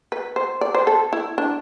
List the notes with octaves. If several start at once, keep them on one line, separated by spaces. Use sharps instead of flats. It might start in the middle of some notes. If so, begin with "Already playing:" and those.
B4
C5
D5
C5
A4
E4
D4